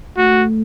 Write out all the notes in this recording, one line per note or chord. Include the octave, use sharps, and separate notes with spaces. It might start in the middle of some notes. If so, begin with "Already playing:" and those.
A3 F#4